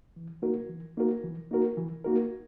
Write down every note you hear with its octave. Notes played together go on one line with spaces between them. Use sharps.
E3
A#3 D#4 F#4 A#4
E3
A#3 D#4 F#4 A#4
E3
A#3 D#4 F#4 A#4
E3
A#3 D#4 F#4 A#4